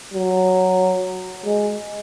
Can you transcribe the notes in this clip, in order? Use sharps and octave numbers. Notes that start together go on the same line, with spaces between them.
F#3
G#3